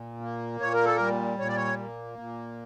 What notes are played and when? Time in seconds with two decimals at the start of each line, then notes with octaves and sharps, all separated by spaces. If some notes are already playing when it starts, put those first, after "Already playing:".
Already playing: A#2
0.21 A#3
0.60 A#2 C#5
0.73 A#4
0.85 A4
0.96 G3 A#4
1.39 A#2 C#5
1.48 D5
1.56 C#5
1.79 A#3
2.18 A#2